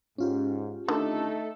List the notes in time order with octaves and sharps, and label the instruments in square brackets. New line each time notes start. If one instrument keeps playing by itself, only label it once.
[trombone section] G#2 [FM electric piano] C#4 F4 G4
[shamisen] D3 D#3 [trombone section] A3 D#4 [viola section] A4